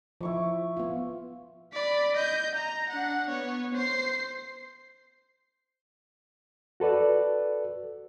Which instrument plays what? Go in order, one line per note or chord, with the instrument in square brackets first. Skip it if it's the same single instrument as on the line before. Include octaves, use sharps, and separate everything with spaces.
[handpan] F3 [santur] E4 C#6 D6
[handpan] B3 F4
[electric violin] D5 B5
D#5 G6
A#5
D4 F#5
B3 C#5
C5 C7
[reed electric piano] F#4 A4 B4 D5